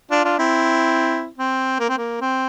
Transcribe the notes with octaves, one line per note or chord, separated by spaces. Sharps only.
D4 F4
D4 F4
C4 E4
C4
A#3
C4
A#3
C4